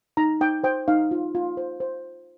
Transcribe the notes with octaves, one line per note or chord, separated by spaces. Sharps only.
D#4 A#5
D#4 G5
C5 G5
D#4 F5
F4
F4
C5
C5